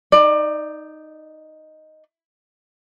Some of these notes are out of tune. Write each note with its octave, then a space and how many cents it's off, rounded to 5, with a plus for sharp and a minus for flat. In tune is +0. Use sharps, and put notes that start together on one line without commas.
D#4 +0 D5 +25